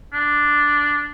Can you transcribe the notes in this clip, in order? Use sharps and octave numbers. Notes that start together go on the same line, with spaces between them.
D4